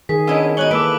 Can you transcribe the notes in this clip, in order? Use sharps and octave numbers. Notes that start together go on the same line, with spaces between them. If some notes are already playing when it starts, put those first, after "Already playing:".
D#3 G#4 B6
B3 C#4 D4 E4 D#5
G#2 B2 C#5 D#5 F#6 F#7 G7
E3 A#3 A4 B4 D6 E6 D7